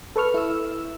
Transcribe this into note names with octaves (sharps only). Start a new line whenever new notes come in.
A4 B4 C#6 F6
E4 E6